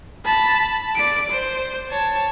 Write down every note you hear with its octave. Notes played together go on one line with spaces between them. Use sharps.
A5 B5
D5 D7
C5
C#5 A5